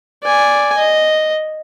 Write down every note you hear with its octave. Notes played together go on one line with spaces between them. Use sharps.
D5 G#5
D#5